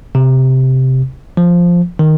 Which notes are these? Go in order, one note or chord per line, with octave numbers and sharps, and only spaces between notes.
C3
F3
D#3